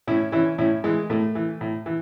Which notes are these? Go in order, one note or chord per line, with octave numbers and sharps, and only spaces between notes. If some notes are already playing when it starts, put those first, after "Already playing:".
A2 C#4 E4
E3 C#4 E4
A2 C#4 E4
E3 G#3
A2 A3
E3
A2
E3